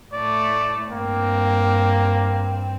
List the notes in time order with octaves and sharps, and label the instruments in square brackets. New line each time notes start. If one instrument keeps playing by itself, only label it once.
[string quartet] A2 A3 [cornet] D5
[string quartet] G2 C4 [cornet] A#3